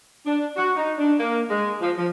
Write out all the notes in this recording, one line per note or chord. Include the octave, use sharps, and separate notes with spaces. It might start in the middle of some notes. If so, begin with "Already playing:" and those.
D4
F#4
D#4
D4
A#3
G#3
F3
F3